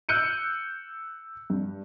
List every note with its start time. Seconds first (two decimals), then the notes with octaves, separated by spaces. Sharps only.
0.09 E6 F#6 G6 C#7 D#7
1.50 G2